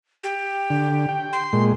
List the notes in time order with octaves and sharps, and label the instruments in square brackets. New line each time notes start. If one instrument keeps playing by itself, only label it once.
[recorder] G4
[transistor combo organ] D3
G5
[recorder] C6
[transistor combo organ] A#2 G#3